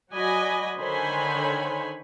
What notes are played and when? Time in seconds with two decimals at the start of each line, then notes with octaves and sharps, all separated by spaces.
0.12 F#3 F#4 D5 D#5 G#5 B5
0.78 D3 D#3 C5 C#5 G#5 B5